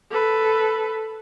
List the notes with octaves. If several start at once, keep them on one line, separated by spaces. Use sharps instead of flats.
A4 B4